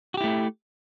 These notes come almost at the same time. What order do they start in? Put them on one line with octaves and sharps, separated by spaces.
F#4 G4 E4 A3